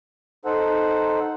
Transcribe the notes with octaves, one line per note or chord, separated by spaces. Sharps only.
D#4 A4 C5 F#5